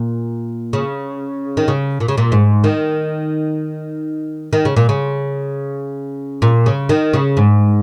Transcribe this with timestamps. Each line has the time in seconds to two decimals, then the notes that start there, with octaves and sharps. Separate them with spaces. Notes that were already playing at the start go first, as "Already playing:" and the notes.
Already playing: A#2
0.73 C#3
1.57 D#3
1.68 C#3
2.00 A#2
2.08 C#3
2.17 A#2
2.32 G#2
2.64 D#3
4.53 D#3
4.65 C#3
4.77 A#2
4.89 C#3
6.42 A#2
6.66 C#3
6.89 D#3
7.14 C#3
7.37 G#2